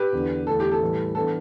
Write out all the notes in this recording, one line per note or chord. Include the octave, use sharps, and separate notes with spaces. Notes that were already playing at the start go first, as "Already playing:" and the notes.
Already playing: G4 B4
E2 D3 B3 D4
E2 D3 A3 A4
G4
A4
A2 E3 G3
E3 B3 D4 A4